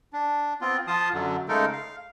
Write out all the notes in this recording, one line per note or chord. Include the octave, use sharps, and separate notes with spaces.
D4
B3 C4 F4
F3 F4 F5 A5 D#6
F#2 D3 F#3
C#3 G#3 A3 D#4 A4 A#4
F5